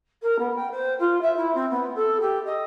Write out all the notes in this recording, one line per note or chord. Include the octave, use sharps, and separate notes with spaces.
A#4
B3
G5
C5
F4
E5
E4
C4
B3
A4
G4
D#5